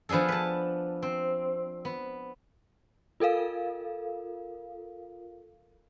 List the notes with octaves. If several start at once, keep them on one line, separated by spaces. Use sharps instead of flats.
F3 B3 D4 G#4 A4
B4 A5
C4
B3
F4 A4 A#4 F5